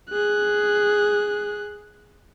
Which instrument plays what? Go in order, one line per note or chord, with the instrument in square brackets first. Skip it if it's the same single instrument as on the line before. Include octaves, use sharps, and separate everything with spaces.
[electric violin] G#4 F#6